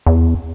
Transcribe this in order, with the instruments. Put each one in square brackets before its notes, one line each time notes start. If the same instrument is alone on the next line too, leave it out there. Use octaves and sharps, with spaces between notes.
[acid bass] E2